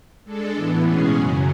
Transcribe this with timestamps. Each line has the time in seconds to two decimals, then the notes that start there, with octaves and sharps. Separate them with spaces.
0.24 G#3 D4 A4
0.55 A2 E3 B3
0.84 B2 G#3 C#4 G#4
1.13 F#2 C#3 F#3